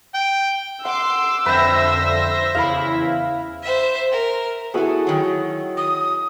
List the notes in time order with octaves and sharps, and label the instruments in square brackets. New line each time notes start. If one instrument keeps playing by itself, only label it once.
[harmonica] G5
[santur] F#5 [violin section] C6 D6 C7 [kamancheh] E6
[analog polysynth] F2 D3 [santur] B4 G5 [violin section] C5 E5 A#6
[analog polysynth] E2 C#3 E4 [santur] F5 B5
[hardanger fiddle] C5 E5
A#4
[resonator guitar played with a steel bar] B3 A4 [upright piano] E4 F#4 G#4
[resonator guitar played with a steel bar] D#3 F#3
[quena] D#6